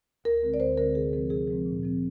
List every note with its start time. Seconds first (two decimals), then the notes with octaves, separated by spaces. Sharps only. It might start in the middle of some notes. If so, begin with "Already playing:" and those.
0.24 D2 A#4
0.42 D3 G#3 C4
0.54 D5
0.60 D2 C5
0.78 D3 G#3 C4 A#4
0.95 C3 G#4
1.13 F3 G#3 C4 A#4
1.30 C3 G#4
1.48 F3 G#3 C4
1.66 A#2
1.83 F3 C4